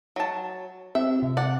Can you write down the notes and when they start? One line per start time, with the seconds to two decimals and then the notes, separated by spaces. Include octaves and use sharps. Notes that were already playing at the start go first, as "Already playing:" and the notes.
0.16 F#3 A5
0.95 C4 G4 E5
1.19 C3 F4
1.37 D5 F#5